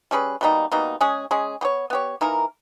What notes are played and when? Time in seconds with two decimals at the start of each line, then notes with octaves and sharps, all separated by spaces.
0.11 G3 C#4 G#4 B4
0.41 B2 G3 A#3 D#4
0.72 B2 G3 A#3 D#4
1.01 G#3 C#4 G#4
1.31 G#3 C#4 G#4
1.61 B3 G4 C#5
1.90 B3 G4 C#5
2.21 E3 A#3 D#4 A#4